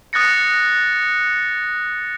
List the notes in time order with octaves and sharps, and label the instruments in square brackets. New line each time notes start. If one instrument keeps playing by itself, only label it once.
[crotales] D#6 F#6 A6 A#6 C#7